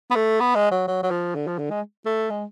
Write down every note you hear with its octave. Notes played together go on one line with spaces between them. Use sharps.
B3
A3
B3
G#3
F#3
F#3
F#3
F3
D3
F3
D3
G#3
A3
G#3